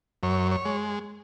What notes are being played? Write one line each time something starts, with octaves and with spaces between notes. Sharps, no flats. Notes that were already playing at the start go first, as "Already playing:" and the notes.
F#2 C#5
C#5
G#3